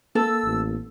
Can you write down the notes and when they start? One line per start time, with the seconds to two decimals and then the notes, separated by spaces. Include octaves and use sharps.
0.15 A#3 A4 E6
0.45 A1